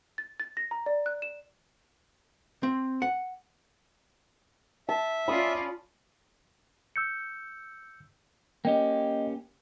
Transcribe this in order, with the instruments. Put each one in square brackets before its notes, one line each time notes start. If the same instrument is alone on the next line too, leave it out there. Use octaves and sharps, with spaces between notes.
[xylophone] A6
A6
A#6
A#5
D5
F#6
E7
[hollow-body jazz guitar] C4
F#5
[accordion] E5 [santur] A5
[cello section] C#4 F4 D5 [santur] B5 D#6
[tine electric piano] E6 G6 C#7
[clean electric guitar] A#3 C#4 G4 [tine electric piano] D#5 G5